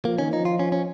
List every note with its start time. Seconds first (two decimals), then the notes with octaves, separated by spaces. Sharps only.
0.05 F3 A#3
0.18 D#3 C#4
0.31 F3 D#4
0.45 F4
0.59 C#4
0.72 C#4